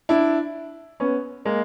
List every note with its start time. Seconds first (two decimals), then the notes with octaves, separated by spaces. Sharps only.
0.09 D4 E4
1.00 B3 C#4
1.45 G#3 A#3